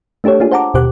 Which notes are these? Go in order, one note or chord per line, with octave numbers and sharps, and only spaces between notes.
A3 D4 G4 A4 C#5
A#3 D4 F4 G#4
C5 F#5 A5 A#5 D6
D#2 B2 G4 C5 D6 F#6